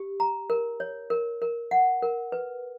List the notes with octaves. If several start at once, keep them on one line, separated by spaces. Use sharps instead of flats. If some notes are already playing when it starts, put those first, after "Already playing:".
Already playing: G4
A#5
A#4
C#5
A#4
A#4
F#5
A#4
B4